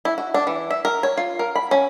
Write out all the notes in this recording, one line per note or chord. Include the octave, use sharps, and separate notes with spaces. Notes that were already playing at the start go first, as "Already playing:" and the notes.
E4
F#4
D4
E3
E5
A#4
C#5
F4
A#4
B5
C#4